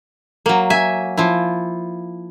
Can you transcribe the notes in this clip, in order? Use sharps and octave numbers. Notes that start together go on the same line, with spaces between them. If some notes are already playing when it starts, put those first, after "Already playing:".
F#3 A#3
E5 G#5
F3 E4